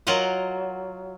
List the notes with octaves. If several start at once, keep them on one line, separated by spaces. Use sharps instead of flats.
F#3 F4 A#4 D#5 F#5